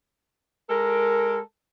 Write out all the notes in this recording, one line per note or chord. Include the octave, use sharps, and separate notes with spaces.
G#3 A4 A#4